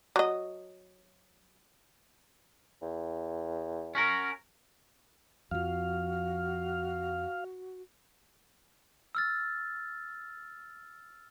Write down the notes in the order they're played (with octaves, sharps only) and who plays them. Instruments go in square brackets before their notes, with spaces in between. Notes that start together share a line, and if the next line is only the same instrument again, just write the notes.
[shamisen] F#3 D#5
[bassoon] E2
[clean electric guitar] C#4 F#4 A#4
[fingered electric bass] F2 F3 [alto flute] F#4 [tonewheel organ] F5
[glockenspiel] E6 F6 A6